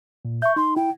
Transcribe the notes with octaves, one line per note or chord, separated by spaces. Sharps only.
A#2
E5 C#6 G6
D#4 C6
E4 G5